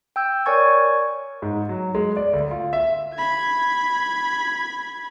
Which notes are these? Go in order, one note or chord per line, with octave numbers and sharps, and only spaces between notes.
G5 E6 G6
A#4 C#5 D5 G#5 C#6 G#6
G#2
F#3
G#3
D5
D2
F4
E5
B5 G#6